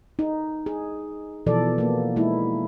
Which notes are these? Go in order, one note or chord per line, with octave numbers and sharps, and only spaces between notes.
D#4
G#4
B2 E3 F3 A4 D5
A#3 B3
G#3 A#3 D#4 E4